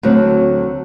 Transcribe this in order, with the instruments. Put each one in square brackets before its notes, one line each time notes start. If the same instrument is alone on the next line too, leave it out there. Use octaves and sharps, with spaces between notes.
[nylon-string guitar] D2 D3 F#3 C4